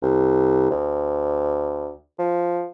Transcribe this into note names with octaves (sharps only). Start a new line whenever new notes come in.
C2
D2
F3